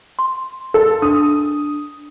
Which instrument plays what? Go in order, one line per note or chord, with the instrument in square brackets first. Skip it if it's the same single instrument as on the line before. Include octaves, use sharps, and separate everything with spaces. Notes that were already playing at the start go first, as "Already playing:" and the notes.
[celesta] C6
[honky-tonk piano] A4
[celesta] D4 [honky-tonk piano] D#6